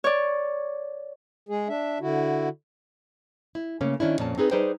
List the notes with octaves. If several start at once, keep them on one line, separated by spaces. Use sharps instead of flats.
C#5 D5
G#3 G#4
D4 E5
D3 E4 F#4
E4
C#3 A3 A#3 C#4
D#3 C#4 D4 E4
F2 A#2 C#4 A5
C4 D#4 G#4 B4
G3 D#4 G#4 B4 C5 G5